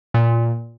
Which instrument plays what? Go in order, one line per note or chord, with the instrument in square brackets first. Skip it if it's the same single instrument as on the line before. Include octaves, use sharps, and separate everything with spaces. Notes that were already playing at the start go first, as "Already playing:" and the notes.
[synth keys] A#2